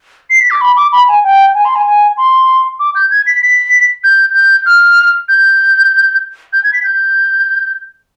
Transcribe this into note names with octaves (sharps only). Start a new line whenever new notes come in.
C7
B6
D6
B5
D6
B5
G#5
G5
G#5
C6
G#5
G#5
C6
D6
G6
G#6
B6
B6
G6
G6
F6
G6
G6
G#6
B6
G6